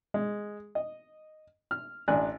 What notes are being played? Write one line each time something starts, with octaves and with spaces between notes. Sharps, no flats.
G#3
D#5
F6
A1 D4 D5 G#5 F#6